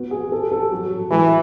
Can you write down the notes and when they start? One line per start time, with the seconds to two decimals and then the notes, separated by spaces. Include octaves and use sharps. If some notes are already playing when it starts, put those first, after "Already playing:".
Already playing: B3 F#4
0.11 G#4
0.32 A4
0.52 A4
0.71 F#3
0.91 F#3
1.11 E3 G#3